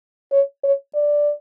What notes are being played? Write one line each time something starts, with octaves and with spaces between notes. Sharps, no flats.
C#5
C#5
D5